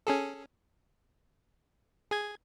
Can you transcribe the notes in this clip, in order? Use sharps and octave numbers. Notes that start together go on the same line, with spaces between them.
C#4 G#4 A4
G#4 G#6